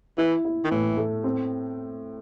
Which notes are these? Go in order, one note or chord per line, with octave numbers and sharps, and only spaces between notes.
E3 E4
E4
D#3
A2 E3
A3
C4